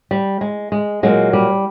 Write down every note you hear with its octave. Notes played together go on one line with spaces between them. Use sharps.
G3
G#3
G#3
A#2 F#3 G#3
G3